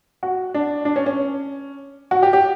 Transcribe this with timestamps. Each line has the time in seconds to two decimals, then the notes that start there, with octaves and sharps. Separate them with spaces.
0.23 F#4
0.54 D4
0.85 D4
0.96 C#4
1.06 C#4
2.11 F#4
2.23 G4
2.33 G4